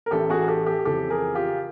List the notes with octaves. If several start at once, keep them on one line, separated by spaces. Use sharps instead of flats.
A#4
A1 A2 E3 A3 G4 A4
F#4 G#4
G4 A4
G4 A4
F2 C#3 E3 G4 A4
G#4 A#4
F4 G4